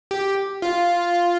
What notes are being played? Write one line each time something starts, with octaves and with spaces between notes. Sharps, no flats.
G4
F4